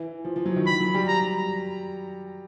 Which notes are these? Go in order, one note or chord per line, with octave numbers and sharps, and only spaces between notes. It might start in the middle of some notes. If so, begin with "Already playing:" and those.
Already playing: E3
F3
F3
F#3
D#3
B5
F#3
G3
A#5